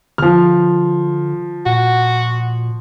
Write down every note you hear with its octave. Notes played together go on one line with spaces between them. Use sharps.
D3 F3 F6
A#2 F#4